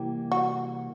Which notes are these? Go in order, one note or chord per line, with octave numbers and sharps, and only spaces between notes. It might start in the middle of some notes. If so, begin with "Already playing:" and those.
Already playing: C3 E3 G3 A#3 G4
F#4